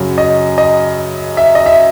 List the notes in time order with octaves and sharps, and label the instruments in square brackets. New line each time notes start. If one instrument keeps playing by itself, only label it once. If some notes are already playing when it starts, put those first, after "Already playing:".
Already playing: [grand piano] F#2 C#3 F#3
D#5
D#5
E5
D#5
E5